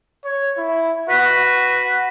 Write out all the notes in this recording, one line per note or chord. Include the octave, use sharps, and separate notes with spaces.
C#5
E4
F#4 B4